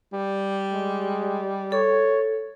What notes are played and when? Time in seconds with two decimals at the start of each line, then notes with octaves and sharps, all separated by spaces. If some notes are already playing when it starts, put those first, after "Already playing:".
0.13 G3
0.72 G#3
1.72 A4 C#5